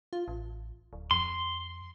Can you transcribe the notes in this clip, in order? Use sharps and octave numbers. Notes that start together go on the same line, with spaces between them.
F4
A1
D1
F2 C6